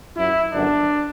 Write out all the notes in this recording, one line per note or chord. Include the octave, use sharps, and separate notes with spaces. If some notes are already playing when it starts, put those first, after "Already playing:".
F#2 F#3 E4
G1 F#2 F#3 D4